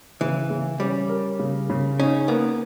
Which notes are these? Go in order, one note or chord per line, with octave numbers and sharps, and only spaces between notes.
C#3 E3
C#3
G3 C#4
A#4
C#3
C#3
C#4 D#4
A#3 B3